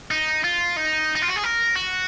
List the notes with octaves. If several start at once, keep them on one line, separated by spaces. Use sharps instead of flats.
D#4
F4
D#4
D#4
F4
F#4
G#4
A#4
F#4